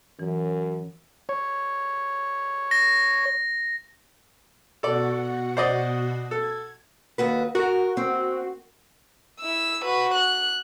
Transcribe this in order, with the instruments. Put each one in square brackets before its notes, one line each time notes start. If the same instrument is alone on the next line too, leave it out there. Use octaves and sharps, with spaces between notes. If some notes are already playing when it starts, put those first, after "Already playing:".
[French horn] F#2 [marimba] E3
[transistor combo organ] C#5
[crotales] A#6
[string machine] B2 F#4 F#5 [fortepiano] A4 D5
[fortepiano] C5 D5 D#5
[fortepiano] A4 [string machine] G#6
[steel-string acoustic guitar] D#2 F#4 B4
[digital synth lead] F#4 [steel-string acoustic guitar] A#4
[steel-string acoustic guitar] C4
[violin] E4 E6
F#4 B4
F#6